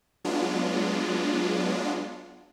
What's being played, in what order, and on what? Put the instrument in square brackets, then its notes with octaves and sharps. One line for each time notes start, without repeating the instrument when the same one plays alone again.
[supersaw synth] F#3 G#3 B3 D4 F4